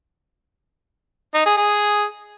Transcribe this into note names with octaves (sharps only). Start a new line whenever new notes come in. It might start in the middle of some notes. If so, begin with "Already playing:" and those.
D#4
G#4
G#4